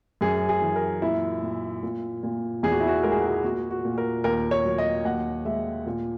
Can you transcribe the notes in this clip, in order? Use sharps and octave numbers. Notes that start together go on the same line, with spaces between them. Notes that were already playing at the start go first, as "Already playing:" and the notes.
F#2 G#4
G#4
E3
A#4
A#2 E4
A#2
A#2
A#2
E2 G#4
F#4
E4
F#4
G#3 A#4
G#4
F#4
G#4
A#2 F#4
F#4
A#2
A#4
D#2 A#4
C#5
F#3
D#5
D#2 F#5
G#3 E5
A#2